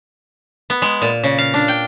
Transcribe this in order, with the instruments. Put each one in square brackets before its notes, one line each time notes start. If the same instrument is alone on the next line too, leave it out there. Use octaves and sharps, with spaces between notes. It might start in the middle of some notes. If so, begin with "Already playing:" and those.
[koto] B3
G#3
A#2
C#3
F5
D4
G5